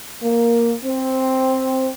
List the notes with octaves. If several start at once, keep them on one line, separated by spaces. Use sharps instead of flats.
A#3
C4